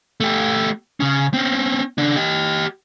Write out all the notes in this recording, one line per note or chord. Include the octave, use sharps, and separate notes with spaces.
A3 G4
C#3 C#4
C4 C#4
C#3 D4
G4 D#5